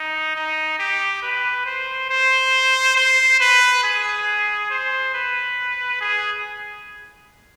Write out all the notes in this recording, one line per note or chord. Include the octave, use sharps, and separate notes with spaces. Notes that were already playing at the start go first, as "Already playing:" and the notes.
Already playing: D#4
D#4
G4
B4
C5
C5
C5
B4
G#4
C5
B4
G#4